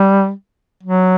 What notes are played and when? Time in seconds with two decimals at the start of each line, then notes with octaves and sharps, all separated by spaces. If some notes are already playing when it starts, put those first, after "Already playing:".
Already playing: G3
0.83 F#3